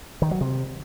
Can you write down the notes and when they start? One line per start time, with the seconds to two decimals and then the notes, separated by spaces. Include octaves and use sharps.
0.22 D#3
0.31 F#3
0.41 C3